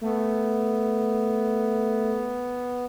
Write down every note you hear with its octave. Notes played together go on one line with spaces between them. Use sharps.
A3 B3